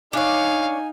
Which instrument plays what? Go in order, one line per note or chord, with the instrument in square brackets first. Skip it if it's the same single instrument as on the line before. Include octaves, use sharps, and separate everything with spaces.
[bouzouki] D4 C#5 [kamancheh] D#4 [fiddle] F5 [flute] G#5